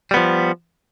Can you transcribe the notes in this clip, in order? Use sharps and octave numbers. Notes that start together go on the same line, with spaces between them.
F3 G3 B3